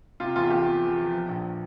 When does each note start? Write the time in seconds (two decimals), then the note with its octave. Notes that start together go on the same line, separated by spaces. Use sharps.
0.20 C3 F4
0.36 E2 F4
0.50 E2 G4
0.66 E2
0.83 E2
0.98 F3
1.13 F3
1.28 A#1